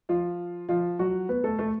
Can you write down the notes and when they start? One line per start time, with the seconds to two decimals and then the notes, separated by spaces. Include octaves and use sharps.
0.09 F3 F4
0.69 F3 F4
0.99 F#3 F#4
1.29 B3 B4
1.44 A3 A4
1.59 A3 A4